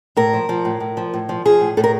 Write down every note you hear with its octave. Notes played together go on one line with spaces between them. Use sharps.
A2 A#4
F3
F3
A2
A2
F3
A2
F3
F3 G#4
A2
A2 A4
A#4